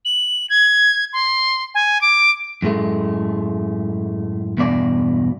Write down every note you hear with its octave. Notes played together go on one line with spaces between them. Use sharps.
F#7
G#6
C6
G#5
D6
F#2 A2 G#3 A3
E2 G2 B2 D5